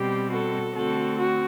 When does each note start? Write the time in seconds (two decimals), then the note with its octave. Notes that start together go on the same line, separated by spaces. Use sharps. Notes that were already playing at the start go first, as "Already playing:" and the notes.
Already playing: B2 G3 C4 G4
0.31 F#4 A4
0.74 D3 A3 C4 F#4 A4
1.18 F#4